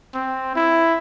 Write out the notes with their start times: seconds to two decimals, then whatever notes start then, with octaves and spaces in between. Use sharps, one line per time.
0.14 C4
0.55 E4